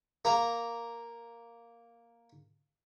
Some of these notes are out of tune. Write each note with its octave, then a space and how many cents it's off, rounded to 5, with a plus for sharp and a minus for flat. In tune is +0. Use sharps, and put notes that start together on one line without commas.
A#3 +0 A#5 +0